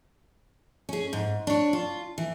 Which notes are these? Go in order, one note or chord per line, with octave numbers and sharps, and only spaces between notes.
C#4 G#4
G#2
D4 C#5
F4
E3